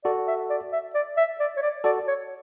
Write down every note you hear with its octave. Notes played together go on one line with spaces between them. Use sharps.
F#4 A4 D5
E5
D5
E5
D5
E5
D5
C#5
D5
F#4 A4 D5
C#5